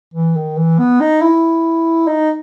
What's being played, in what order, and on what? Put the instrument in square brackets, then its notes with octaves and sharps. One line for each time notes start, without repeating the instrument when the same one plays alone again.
[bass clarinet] E3
D#3
E3
B3
D#4
E4
D#4